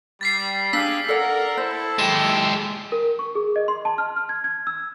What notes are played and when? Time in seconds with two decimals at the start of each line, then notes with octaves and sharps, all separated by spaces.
0.21 G3 A6 B6 C7
0.73 D4 G4 G#4 F5 E6 B6
1.09 A4 A#4 D5 F#5
1.57 E4 A4 C5
1.98 G#3 G4 E7
2.92 A#4
3.19 C#6
3.35 G#4
3.56 D#5
3.68 C6
3.85 A5
3.98 F6
4.16 F6
4.29 G#6
4.44 G#6
4.67 E6